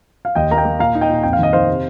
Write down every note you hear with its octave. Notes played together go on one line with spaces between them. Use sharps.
F5
D#2 D#5 G5
A#3 A#5
D#5 G5
A#3
A#2 F5 A#5
D#4
D#5 G5
A#2
F2 G5
F5
D#3 D#5
D#3 C5 F5
C3